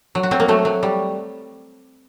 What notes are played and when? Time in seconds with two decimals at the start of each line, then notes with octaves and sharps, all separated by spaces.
0.15 F#3
0.23 F#4
0.31 F#3 C4
0.40 A#3
0.48 F#3 A3
0.65 F#3
0.83 G3